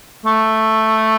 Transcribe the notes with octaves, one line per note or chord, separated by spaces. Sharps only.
A3